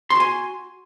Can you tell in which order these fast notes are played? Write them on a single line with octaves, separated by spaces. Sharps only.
C6 F#4 G#5